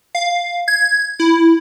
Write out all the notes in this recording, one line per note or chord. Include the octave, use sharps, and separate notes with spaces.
F5
G#6
E4